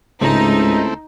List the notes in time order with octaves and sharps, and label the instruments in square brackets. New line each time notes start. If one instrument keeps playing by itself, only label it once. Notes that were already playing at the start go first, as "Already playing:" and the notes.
[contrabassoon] C#2 [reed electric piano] G#2 C#3 G#3 [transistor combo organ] A3 C4 E4 [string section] D#4